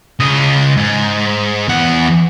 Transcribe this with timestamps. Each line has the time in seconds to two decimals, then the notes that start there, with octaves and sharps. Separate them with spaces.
0.20 C#3 D#5
0.77 G#2
1.68 E2 F#5